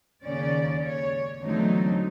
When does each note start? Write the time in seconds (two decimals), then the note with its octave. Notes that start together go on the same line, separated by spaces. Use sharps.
0.24 D#2 C#3 C#4 D5
0.85 C#5
1.41 E2 D3 F#3 A3 C4 D#4